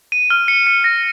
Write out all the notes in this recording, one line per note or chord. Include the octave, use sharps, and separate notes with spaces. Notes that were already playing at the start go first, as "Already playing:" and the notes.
D#7
F6
C#7
C#7
A#6